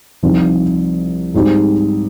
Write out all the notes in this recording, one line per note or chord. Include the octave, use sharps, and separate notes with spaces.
C2 C3 F3 C4 D#4
G#2 G3 C4 D#4 G4